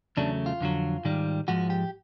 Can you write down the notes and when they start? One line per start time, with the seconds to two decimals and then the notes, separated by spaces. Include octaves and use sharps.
0.17 E2 C#3 F#3 A3 D4
0.46 F4
0.60 F2 D3 F#3
1.05 G#2 D#3 G3
1.48 G#2 F3 G#3 F#4
1.70 G4